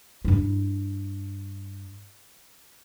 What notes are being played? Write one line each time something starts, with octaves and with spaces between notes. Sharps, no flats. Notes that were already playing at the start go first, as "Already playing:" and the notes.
G2 E4